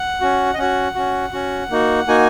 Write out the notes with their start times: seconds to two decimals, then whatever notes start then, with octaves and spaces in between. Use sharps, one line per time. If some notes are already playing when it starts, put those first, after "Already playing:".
Already playing: F#5
0.21 C#4 F#4
0.54 D#5
0.58 C#4 F#4 F#5
0.95 C#4 F#4
1.33 C#4 F#4
1.71 A#3 D#4 F#4
2.08 A#3 D#4 F#4 G#5